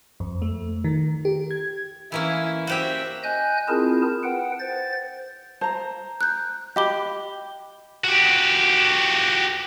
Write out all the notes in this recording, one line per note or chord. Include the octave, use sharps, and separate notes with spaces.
F2
A3
D#3
G4
G#6
E3 A#3 C#4 E4
F#4 G4 C5 E5 G5
D#5 G#5 F#6 G6
C4 E4 F4 G#4 A#4 A5
B4 F#5 G5
C5 A6
C5 A5 A#5
F#6 G6
G4 D#5 B5 D6 G7
F#4 G4